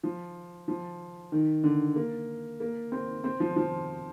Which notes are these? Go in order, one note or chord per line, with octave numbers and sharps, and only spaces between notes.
F3
F3
D#3
D3
A#3
A#3
C4
C4
F3
F3